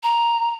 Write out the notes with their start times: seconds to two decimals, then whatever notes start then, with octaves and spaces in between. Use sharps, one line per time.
0.03 A#5